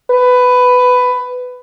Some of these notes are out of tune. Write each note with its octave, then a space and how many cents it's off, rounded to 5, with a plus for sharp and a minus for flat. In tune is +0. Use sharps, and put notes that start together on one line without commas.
B4 +15